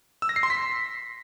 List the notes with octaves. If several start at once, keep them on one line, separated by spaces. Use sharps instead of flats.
E6
A#6
C7
C6
B6